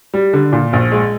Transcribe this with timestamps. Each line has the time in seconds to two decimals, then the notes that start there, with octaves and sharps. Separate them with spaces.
0.14 G3
0.33 D3
0.52 A#2
0.73 A#1
0.92 G#3